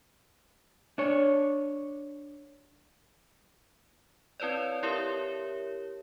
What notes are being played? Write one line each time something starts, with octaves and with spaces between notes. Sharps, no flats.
D4 C#5
C4 E4 B4 C#5 D5
E4 G4 A#4 C#5 E5